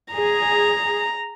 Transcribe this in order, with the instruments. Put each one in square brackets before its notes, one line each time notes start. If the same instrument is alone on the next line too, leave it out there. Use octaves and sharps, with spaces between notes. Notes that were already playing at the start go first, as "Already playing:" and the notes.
[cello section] G#4 [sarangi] A#5